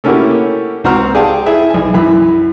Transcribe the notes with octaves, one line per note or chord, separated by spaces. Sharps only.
A3 A#3 C#4 E4 F#4 G4
C#2 C4 F#4 A#5 C6 F6
G4 G#4 D5 F5 G5 A5
E4 G#4 E5
B1 G#5
F#2 E3 B5